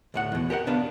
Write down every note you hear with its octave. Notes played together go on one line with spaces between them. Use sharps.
D2 A2 F#5
E2 B2
G4 A#4 D#5 F#5
C#3 B3 D4 F5